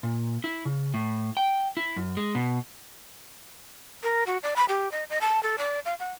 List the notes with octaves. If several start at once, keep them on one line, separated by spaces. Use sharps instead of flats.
A#2
E4
C#3
A2
G5
E4
F#2
G#3
B2
A#4
F#4
D5
B5
G4
D#5
D#5
A5
A4
D5
F5
F#5